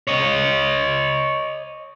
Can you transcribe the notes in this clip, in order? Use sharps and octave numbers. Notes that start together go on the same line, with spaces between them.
C#5 D#5